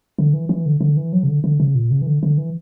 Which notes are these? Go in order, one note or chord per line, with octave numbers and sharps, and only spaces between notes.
D3
E3
E3
D3
D3
E3
F#3
C#3
D3
D3
C#3
A#2
C#3
E3
D3
D3
E3